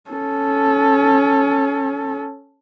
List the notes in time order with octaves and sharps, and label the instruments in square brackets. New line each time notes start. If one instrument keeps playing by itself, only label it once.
[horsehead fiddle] C#4 A4